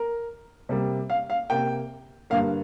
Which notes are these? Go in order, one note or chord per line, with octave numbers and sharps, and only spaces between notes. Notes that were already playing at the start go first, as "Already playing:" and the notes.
Already playing: A#4
C3 G3 A#3
F5
F5
C3 A#3 G5
G2 D3 A#3 F5